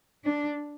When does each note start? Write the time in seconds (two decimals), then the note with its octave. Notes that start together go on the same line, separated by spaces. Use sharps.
0.25 D4